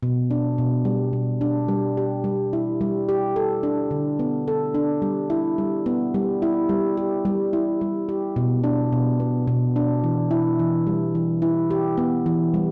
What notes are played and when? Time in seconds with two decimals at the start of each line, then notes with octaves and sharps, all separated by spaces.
0.03 B2
0.31 D4
0.58 B2
0.85 G3
1.13 B2
1.41 D4
1.68 G3
1.97 G4
2.24 G3
2.53 E4
2.81 G3
3.09 G4
3.36 A4
3.63 D4
3.91 D3
4.19 B3
4.48 A4
4.74 D4
5.02 G3
5.30 E4
5.58 G3
5.86 B3
6.14 G3
6.42 E4
6.69 G3
6.97 G4
7.25 G3
7.53 E4
7.81 G3
8.09 G4
8.36 B2
8.64 D4
8.93 B2
9.20 B3
9.47 B2
9.76 D4
10.04 E3
10.31 E4
10.59 E3
10.87 G3
11.15 E3
11.42 E4
11.71 G4
11.98 B3
12.26 E3
12.54 G3